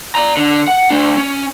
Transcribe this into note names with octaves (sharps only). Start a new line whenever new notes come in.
D5 A#5
D3
F#5
A3 D4
C#4